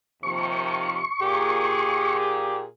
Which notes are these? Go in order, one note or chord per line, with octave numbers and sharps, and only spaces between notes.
D#2 C3 F3 C#6
A#2 G4 G#4